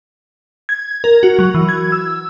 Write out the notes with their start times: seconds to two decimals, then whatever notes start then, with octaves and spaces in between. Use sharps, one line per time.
0.69 G#6
1.04 A#4
1.23 F#4
1.39 F#3
1.54 E3
1.69 G#6
1.92 E6